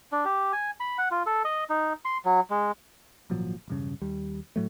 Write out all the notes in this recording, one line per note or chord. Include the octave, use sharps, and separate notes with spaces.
D4
G4
G#5
B5
F#5
F4
A4
D#5
D#4
C6
F#3
G#3
G#1 A#2 F3 F#3
E1 G2 C#3
D#2 G3
A2 F#3 A3